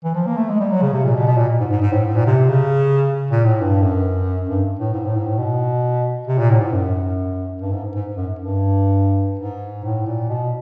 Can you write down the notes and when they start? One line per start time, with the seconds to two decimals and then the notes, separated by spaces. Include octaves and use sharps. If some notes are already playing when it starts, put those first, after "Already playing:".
0.04 E3
0.15 F3
0.27 A#3
0.37 A3
0.49 G#3
0.60 G3
0.71 F#3
0.82 C#3
0.93 C3
1.05 A#2
1.15 B2
1.27 B2
1.38 A#2
1.60 G#2
1.71 G#2
1.82 G#2
1.93 A2
2.05 G#2
2.16 A#2
2.26 C3
2.49 C#3
3.31 A#2
3.45 A2
3.61 G2
3.83 F#2
4.49 G2
4.79 A2
4.93 G#2
5.05 A2
5.16 G#2
5.27 A2
5.39 B2
6.28 C3
6.39 A#2
6.51 A2
6.62 G#2
6.73 F#2
7.61 G2
7.73 G#2
7.95 G#2
8.17 F#2
8.39 G2
9.39 G#2
9.84 A2
10.06 A#2
10.29 B2